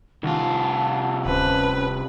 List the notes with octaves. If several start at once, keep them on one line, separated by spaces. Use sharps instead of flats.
C2 D#3 F4 F#5 G#5 A5
D1 C#4 B4 C5 A5